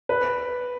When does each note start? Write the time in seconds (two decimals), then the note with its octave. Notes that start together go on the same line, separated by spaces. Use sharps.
0.09 B4